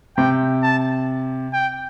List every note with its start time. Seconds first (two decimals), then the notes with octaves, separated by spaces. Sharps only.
0.17 C3 G5
0.63 A5
1.54 G5